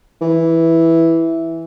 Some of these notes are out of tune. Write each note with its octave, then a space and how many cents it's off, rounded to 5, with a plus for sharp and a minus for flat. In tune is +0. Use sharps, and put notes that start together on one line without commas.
E3 -5